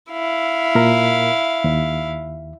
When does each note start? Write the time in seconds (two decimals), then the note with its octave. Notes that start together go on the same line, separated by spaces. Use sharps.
0.11 E4 F5
0.75 A#2 A#4
1.64 D#2